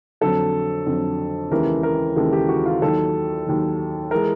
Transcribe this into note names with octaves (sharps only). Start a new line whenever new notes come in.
F2 D3 F#3 A4
F2 D3 F#3
D#2 C#3 E3 G#3 A#4
A#4
D#2 C#3 E3 G#3 A4
G4
F#4
F4
D#2 D#3 F#3 A4
D#2 D#3 F#3
E3 G#3 A#4